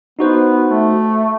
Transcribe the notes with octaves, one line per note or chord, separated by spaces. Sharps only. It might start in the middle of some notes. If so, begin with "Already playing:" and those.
B3 D#4 F#4 C5
A3